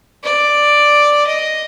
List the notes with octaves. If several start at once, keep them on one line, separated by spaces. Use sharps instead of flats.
D5
D#5